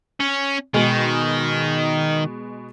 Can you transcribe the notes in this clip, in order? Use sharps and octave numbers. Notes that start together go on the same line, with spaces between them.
C#4
B2 D#3 G#3 G#4